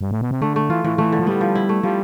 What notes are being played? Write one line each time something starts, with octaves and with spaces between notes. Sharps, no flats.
G2
A2
B2
C3
D3 A3
A3
E3 F4
A2 E3
E3 A3
D3
F3
G3 B3
F3
E4
A3
F3 G3